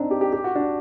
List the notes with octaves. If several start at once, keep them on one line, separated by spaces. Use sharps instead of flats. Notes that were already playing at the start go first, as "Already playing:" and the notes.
Already playing: C4 D4 D#4
G4
G4
G4
F#4
D4